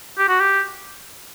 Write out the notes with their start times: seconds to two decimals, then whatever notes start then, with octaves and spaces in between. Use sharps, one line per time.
0.18 G4
0.29 F#4
0.40 G4